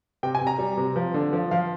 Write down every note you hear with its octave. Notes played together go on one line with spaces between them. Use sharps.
C3 G5
G#5
C3
A#5
G3
C3
F3
D3
F3
F3 F5